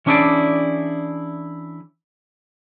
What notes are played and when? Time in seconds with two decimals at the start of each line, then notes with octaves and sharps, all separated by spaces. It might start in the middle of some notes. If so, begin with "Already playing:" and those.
0.06 E3 C#4 D4 E4 G#4 D5